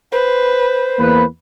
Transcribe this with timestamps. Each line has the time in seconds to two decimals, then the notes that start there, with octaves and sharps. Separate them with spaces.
0.12 B4 C5
0.98 E2 A#3 B4